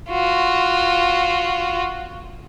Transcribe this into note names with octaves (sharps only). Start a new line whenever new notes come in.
F4 F#4